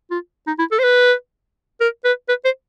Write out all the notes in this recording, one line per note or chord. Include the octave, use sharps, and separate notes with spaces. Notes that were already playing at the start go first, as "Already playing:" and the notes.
F4
D#4
E4
A4
C5
B4
A#4
B4
B4
C5